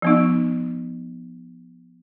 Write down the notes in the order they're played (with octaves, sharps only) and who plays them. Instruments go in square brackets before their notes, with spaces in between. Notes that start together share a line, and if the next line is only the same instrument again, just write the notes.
[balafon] F3 B3 D#4